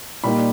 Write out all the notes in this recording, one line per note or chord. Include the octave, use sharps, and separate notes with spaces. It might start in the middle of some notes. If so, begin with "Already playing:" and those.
A#2 G3 A#3 D#4 B5